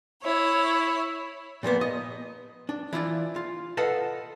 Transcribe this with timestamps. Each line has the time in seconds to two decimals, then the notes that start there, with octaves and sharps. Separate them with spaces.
0.22 E4 C#5
1.63 A#2 F3 A#3 B3
1.81 D#5
2.69 D4
2.93 E3 E4 F4 D5
3.36 F4
3.77 A4 B4 D#5 F5 F#5 A5